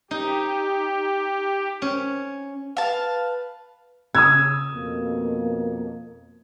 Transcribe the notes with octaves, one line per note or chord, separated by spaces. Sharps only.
D#4 G4
C#4
B4 F5 A5
C#3 D#6 E6 G#6
F2 B2 A#3